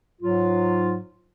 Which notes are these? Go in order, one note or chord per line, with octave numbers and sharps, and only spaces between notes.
G#2 F#3 F4